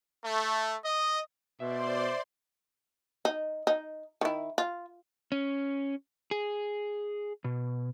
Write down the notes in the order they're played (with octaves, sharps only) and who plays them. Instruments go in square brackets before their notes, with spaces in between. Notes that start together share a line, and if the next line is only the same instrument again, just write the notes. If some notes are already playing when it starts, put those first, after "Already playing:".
[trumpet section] A3
D#5
[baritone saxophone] B2 [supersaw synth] C5 D5 C6 [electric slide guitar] E5
[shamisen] D#4
D#4
D#3 E4
F4
[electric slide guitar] C#4
G#4
B2